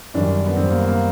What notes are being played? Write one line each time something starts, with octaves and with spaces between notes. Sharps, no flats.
F#2 D#3 G3 D4
B3
F#2 D#3 G3 C4
A#3
A#3